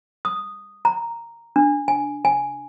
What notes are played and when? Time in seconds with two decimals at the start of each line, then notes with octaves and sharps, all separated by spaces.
0.25 D#6
0.85 A#5
1.56 D4
1.88 G#5
2.25 G#5